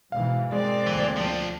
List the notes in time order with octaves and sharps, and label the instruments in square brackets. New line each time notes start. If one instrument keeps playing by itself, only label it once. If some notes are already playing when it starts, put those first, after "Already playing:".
[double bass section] G#2 B2 E3 [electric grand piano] F5
[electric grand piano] G#3 [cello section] A#3 C4 D5
[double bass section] D2 D3 [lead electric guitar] E3
[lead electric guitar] F3 D4